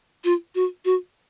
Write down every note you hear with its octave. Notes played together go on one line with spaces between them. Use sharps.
F4
F#4
F#4